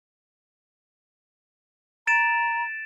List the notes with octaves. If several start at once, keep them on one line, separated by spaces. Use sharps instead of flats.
A#5 A6 D7 E7